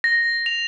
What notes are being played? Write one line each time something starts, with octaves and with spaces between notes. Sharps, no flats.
A#6
F7